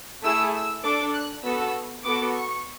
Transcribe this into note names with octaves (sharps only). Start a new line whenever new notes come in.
A3 E4 G#4 E6
E6
D4 A4 D6
F#6
B3 F#4 A4 E6
B3 F#4 A4 D6
C#6